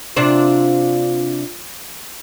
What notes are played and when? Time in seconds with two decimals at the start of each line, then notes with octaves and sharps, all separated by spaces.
0.16 C3 D4 F4 C5